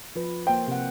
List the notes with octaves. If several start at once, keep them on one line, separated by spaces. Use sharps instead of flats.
F3 B4
A#3 C5 G5
C3 F#5